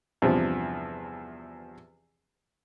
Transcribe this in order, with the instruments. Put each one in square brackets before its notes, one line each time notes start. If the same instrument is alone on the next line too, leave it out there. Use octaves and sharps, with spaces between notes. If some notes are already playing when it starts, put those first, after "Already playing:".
[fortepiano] E2 G2 C3 F3